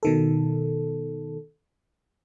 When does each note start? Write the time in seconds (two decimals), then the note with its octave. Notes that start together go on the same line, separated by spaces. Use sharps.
0.03 B2 D#3 A4